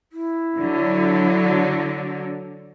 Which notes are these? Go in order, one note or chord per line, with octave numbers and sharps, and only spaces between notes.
E4
D3 F#3